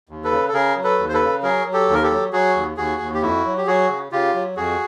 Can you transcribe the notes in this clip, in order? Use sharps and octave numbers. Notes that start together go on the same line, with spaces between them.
D#2
A4 B4
C#3
A4
C#3 G#4 A#4
F#3
A4 B4
D#2
C5
A4 B4
C#3
F#3 G#4 A#4
F#3
G4 A4
D#2
A#4
G4 A4
F#3
F#3 F#4 G#4
D#2
D#2 F#4 G#4
D#2
G4
F2 E4 F#4
F#3
G4
F#3 F#4 G#4
C#3
C#3 F4 G4
F#3
F2 F#4 G#4